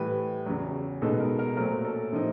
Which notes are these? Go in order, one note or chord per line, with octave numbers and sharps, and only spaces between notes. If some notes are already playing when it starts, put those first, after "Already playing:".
Already playing: A2 E3 G3 B4
E2 C#3 F#3
B2 G#3 B3 D#4 A4
A#4
A#4
A#2 F#3 A3 C4 A#4
A4
C3 F3 A#3 D#4